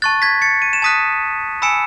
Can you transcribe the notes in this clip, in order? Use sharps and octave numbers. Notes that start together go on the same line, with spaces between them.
A5 C#6 F#6 A6
G#6 B6
A6 C#7
D#7
E7
A5 D#6 F#6 B6 D#7
G#5 B5 E6 C#7 E7